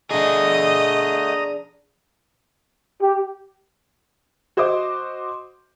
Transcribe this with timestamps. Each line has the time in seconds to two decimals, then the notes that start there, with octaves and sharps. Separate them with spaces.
0.11 D3 A3 D4 G#4 D#5 A#5 D#6
3.02 G4
4.57 F#4 C5 D#5 C6 D6